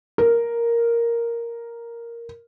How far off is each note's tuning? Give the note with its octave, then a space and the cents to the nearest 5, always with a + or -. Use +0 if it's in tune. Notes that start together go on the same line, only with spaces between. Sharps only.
A#4 +0